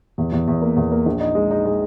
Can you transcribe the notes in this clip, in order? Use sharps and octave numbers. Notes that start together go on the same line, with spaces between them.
E2
E2
E2
A#3
E2
A#3
A#1
D#4
G#3
D#4
G#3